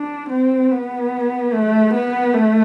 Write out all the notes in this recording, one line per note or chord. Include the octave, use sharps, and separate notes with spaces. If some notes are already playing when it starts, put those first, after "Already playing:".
Already playing: D4
C4
B3
A3
B3
A3